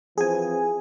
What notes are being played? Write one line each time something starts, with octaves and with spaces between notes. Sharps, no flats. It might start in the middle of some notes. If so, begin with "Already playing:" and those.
E3 F3 C4 G#4 G#5